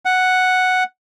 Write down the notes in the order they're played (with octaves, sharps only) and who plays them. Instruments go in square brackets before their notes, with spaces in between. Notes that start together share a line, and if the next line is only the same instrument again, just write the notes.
[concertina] F#5